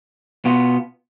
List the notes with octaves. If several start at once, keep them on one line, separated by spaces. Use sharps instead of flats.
B2 B3 F4